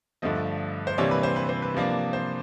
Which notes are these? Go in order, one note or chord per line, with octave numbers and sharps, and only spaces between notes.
G2 D3 F3 A3 D#5
C5
C3 E3 G3 A#3 D4 C#5
B4
C5
B4
C5
B4
C3 F3 A#3 D4
C5